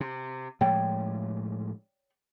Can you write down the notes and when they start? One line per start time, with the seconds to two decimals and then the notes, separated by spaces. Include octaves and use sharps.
0.01 C3
0.61 A2 F3 G#3 C#5 D5 G5